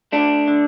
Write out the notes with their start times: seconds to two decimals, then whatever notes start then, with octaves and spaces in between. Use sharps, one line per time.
0.12 A3 D4
0.48 D3